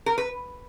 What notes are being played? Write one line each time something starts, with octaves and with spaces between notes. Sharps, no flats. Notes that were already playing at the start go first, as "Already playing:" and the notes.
A#4
B4